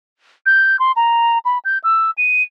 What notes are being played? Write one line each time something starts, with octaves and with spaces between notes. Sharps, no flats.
G6
C6
A#5
B5
G6
E6
D#7